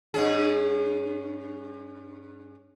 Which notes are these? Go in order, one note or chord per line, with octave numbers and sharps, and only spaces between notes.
G2 C#4 G#4